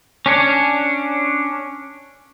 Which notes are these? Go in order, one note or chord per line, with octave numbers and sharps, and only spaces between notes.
C#4 D4 C#5